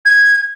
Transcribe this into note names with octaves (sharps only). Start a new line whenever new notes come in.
G#6